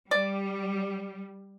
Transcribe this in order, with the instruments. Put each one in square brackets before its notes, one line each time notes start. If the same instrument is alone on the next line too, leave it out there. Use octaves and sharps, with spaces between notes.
[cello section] G3 [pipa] D5